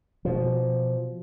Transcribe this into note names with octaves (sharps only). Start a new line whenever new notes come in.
B2 F3